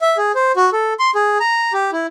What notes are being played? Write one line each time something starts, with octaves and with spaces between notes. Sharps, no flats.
E5
G#4
C5
F#4
A4
C6
G#4
A#5
G4
E4